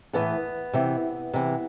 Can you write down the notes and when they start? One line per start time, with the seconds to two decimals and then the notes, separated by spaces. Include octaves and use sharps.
0.13 A2 E3 B3
0.73 C3 E3
1.33 C3 E3